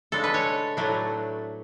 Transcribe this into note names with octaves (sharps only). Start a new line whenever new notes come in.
C#3 G#3 D4 A4
B4
C#5
A2 F#3 A3 D4